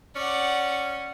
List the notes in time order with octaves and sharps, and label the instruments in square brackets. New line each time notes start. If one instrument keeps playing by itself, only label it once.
[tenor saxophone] C#4 [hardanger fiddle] D5 F#5